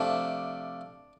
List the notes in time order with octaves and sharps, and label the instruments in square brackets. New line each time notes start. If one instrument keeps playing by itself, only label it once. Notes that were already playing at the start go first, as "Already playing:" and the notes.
Already playing: [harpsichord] C3 F3 A3 D4